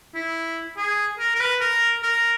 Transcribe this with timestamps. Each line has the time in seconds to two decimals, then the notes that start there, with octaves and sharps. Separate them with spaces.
0.15 E4
0.77 G#4
1.19 A#4
1.36 A#4
1.40 B4
1.61 A#4
2.03 A#4